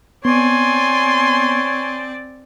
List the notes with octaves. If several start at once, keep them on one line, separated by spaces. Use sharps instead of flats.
B3 C4 C#5 D5 G#5 C6